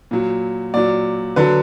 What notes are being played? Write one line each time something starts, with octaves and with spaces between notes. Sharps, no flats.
A#2 F#3
A#2 F#3 D5
D3 F#3 B4